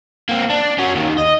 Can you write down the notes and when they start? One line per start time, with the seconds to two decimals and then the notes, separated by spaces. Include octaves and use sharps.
0.29 A#3 C4
0.50 D4
0.78 C#4 F#4
0.95 D#2 D#3
1.18 D#5